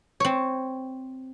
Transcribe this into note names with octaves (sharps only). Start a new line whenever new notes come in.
C4 C#5